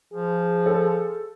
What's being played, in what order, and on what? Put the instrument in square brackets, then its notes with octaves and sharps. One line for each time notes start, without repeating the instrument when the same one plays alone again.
[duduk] F3 [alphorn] G#4
[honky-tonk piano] A4